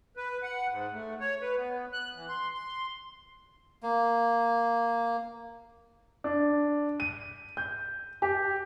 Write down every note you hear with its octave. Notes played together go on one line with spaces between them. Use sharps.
B4
F#5
G#2
A3
C#5
B4
B3
F#6
E3
C6
C6
A#3
D4
D#7
G6
G4